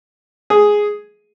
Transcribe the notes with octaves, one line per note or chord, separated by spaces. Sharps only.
G#4